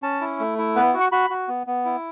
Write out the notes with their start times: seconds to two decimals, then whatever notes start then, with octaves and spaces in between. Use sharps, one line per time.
0.03 C#4 A5
0.21 E4
0.40 A3
0.58 E4
0.76 B3 B4
0.94 F#4
1.00 C#6
1.12 F#4 B5
1.30 F#4
1.48 B3
1.67 B3
1.85 E4